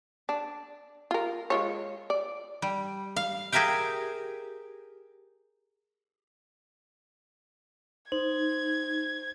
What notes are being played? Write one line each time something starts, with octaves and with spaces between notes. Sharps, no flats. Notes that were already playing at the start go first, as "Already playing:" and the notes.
D4
F4 A#4
G#3 F4 C#5
D5
G3
F5
G4 G#4 A#4 E5 F5 G5
D#4 C5 G#6